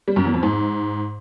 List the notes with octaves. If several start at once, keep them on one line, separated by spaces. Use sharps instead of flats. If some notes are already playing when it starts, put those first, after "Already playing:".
G3
F#2
E2
F2
G#2